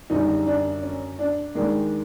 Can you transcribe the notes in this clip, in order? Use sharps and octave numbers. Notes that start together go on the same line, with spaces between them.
F#2 D3 G3 D#4
D4
C#4
D4
D#2 D#3 G#3 D4